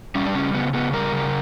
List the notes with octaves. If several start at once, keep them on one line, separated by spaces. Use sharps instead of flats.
G3 C#4
D4
C#3 C#4
C#3 B3
C#3 B3
G3 A#4
C#3